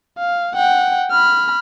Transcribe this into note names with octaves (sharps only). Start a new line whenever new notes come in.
F5
F#5 G5
B5 F6